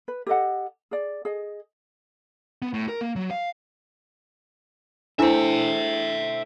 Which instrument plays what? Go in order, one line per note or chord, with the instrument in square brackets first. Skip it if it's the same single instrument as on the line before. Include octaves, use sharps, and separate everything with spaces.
[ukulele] B4
G4 A4 D#5 F#5
G#4 D5
G#4 D#5
[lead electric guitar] B3
A2
A#4
A#3
F#3
F5
[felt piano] A3 C5 [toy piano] D4 E4 [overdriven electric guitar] E5 G5